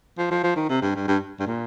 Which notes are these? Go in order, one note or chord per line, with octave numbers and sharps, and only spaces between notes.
F3
F3
F3
D#3
C3
G2
G2
G2
G2
A#2